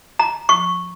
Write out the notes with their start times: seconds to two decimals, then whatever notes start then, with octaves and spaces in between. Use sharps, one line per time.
0.19 A#5
0.49 C#6